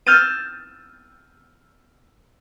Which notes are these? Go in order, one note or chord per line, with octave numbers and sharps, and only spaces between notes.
E6 F6 G6 A6 D#7